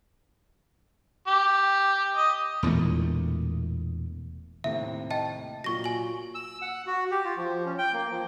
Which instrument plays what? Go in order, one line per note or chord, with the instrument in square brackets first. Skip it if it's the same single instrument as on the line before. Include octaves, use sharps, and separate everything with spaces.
[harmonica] G4
D#5
[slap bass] E1 E2 A#2 A3
[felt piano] D#2 A2 C3 [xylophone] E5
[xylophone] D#5 G5 A5
[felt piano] A#2 F#3 [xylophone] C#6 A#6
[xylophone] G#5 F#7
[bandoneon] E6
F#5
F#4
G4
F4
F3
C#4
G5
A#3
F3